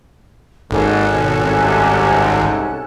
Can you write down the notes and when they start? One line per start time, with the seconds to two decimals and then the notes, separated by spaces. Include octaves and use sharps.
0.71 G#1 D#2 G#2 C#4 A4 F#6
1.14 B2
1.42 C2 G#2 C3